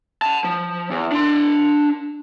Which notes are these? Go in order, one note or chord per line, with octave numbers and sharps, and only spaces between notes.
F#5 A5
F3
E2
D4 C6